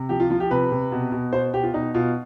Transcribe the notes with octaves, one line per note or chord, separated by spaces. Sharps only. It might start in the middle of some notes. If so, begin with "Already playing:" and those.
Already playing: C3
F3 G4
F4
F3 F4
G4
C3 B4
C3
B2
B2
B2 C5
B2 G4
F4
B2 D#4
B2 F4